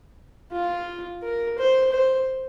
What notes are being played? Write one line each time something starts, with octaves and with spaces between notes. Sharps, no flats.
F4
A#4
C5
C5